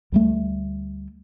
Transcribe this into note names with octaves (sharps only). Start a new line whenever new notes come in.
D2 G3 A3